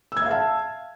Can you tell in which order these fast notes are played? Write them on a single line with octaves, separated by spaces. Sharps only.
E6 G#6 E5 F5 A5